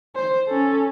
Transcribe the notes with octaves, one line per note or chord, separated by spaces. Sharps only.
C5
C#4 A4